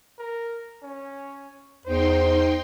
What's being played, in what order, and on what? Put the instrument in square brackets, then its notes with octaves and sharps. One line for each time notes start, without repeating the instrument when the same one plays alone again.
[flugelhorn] A#4
C#4
[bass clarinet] E2 [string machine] D#4 G5 C6 [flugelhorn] C5